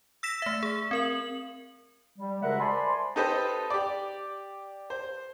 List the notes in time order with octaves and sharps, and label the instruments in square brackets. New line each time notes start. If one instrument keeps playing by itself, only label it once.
[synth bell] E6 A#6 B6 E7
A3 E5
G#4
C4 A#4 F#7
[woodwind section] G3
D2 C#3 G#3 A#4 E5 F#5
C5 D5 G#5 A5 B5 C6
[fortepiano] D#4 G4 A4 B4 C5 D#5
G4 D5
C5